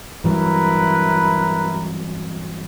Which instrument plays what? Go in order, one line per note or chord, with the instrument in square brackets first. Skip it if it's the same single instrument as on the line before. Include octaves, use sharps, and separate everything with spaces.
[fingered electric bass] G2 E3 F#3 [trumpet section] E4 A#4 B4